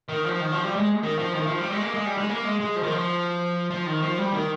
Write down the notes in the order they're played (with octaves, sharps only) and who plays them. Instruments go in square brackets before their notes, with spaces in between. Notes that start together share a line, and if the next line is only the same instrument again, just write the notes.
[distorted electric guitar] D#3
F3
D#3
F3
G3
G#3
D#3
F3
D#3
F3
G3
G#3
A#3
G#3
G3
G#3
A#3
G#3
G#3
F3
D#3
F3
F3
D#3
F3
G3
D#3